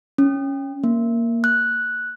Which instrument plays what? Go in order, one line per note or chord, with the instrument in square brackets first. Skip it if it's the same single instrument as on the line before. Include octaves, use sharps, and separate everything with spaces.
[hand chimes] C#4
A#3
F#6